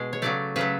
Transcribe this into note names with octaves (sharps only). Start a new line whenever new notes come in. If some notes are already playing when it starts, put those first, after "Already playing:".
Already playing: B2 G#3
C#5
C#3 F#3 A3 D5
C#3 F#3 A3 B4